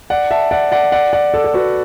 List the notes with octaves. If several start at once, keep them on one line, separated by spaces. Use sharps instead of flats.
D5 F#5
E5 A5
D5 F#5
D5 F#5
D5 F#5
D5 F#5
A4 D5
A4
F#4 B4